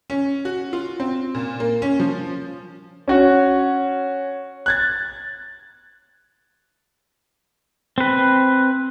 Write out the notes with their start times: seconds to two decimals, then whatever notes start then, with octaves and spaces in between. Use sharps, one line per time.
0.10 C#4
0.45 F#4
0.73 F4
1.00 C4
1.35 A#2
1.60 A#3
1.82 C#4
2.00 F3
3.08 C#4 F#4 C#5
4.66 F#6 G#6 A6
7.98 C4 B4